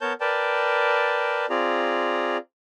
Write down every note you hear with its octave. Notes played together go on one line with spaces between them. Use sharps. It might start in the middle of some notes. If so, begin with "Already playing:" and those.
B3 A#4 C#5 A5 G6
A#4 B4 D5 G5 A5
C4 F4 G#4 D5 A#5